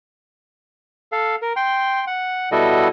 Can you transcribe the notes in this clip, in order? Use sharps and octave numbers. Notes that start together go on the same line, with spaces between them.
A4 F5
A#4
G5 C6
F#5
B2 G3 E4 F#4 A4 D#5